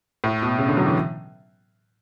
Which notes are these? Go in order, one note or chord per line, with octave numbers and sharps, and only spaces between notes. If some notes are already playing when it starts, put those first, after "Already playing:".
A2
B2
C#3
D3
F#3
E3